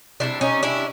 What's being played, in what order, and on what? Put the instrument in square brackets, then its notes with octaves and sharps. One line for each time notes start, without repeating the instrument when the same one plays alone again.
[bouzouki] C3 D#3 G3 D4 E4
C#4 D#4
D4 E4